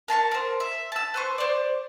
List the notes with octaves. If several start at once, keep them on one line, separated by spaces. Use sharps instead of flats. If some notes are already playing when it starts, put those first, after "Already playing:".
A#4 A5 C6 C#6
A#4 C5
E5
A5 E6
B4 C5 C#6
C5 D5